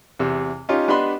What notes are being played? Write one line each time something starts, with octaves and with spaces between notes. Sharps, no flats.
E2 C3
C#4 D#4 F4 G4
B3 D4 G4 D#5 B5 C6